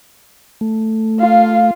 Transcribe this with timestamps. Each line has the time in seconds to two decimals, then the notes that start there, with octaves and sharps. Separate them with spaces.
0.61 A3
1.20 F4 F5